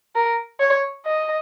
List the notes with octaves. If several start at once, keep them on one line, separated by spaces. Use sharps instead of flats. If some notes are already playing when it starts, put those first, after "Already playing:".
A#4
C#5
D#5